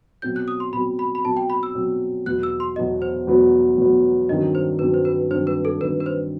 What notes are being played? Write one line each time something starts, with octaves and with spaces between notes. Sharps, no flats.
B2 F#3 C4 G6
F#6
D#6
C6
B2 F#3 C4 B5
B5
B5
B2 F#3 C4 A5
G5
B5
E6
B2 F#3 C4
E2 B2 F#3 B3 F#6
E6
C6
E2 B2 F#3 B3 D#5
C5
E2 B2 F#3 B3
E2 B2 F#3 B3
G2 D#3 F#3 C4 D#5
C5
G2 D#3 F#3 C4 B4
C5
B4
G2 D#3 F#3 C4 C5
B4
A4
G2 D#3 F#3 C4 B4
B4
C5